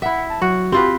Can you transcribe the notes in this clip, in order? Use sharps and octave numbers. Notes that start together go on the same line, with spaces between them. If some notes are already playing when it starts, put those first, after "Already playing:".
E4 E5 F#5
A5
F#3 F#4
C4 F4 G4 B4